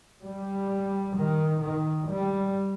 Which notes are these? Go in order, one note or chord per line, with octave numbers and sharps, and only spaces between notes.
G3
D#3
D#3
G3